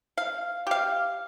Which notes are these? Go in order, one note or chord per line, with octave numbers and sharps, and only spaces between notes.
F5
G4 F5